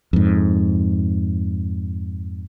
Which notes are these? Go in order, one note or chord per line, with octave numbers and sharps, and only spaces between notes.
F2 G#2